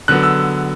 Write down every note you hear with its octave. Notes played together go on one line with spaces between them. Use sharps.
D3 F#3 B3 F#6
E6